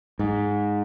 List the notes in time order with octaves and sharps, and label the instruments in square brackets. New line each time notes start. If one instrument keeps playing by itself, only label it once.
[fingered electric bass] G#2